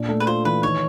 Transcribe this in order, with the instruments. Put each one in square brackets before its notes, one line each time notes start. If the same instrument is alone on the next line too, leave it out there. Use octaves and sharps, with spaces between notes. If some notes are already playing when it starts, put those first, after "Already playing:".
Already playing: [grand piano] A#2 D4
A3
[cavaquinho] B4
[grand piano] F4 [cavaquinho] C5
[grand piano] E3 [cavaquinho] B4
[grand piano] D#3 [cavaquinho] C#5